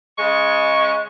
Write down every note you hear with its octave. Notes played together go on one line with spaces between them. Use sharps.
C#3 G#3 C#6